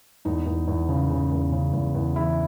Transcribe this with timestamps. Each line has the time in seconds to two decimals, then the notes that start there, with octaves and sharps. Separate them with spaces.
0.25 E2 D#4
0.46 E2
0.68 E2
0.89 C#3
1.10 C#3
1.31 E2
1.52 C#3
1.73 E2
1.94 E2
2.15 E3 E4